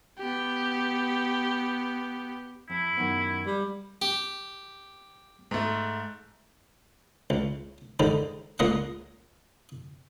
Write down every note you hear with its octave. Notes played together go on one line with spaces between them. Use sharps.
B3 G4
F2 E4
F#2 D#3 B3
G3
G4
G#2 A3
C#2
G#2 D3 D#3 D#4
C#2 A#2 A#4 D#5 F#5